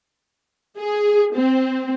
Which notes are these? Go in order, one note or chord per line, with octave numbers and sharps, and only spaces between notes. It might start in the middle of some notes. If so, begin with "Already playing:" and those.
G#4
C4